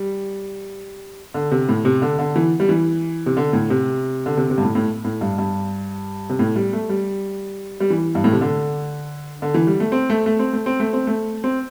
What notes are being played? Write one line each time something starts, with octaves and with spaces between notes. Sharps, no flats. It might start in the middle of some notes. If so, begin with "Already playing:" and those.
Already playing: G3
D3
C3
A2
C3
D3
D3
E3
G3
E3
C3
D3
A2
C3
D3
C3
C3
G2
A2
A2
A2
G2
G2
C3
A2
G3
A3
G3
G3
E3
G2
A2
C3
D3
D3
E3
G3
A3
C4
A3
A3
C4
A3
C4
A3
C4
A3
C4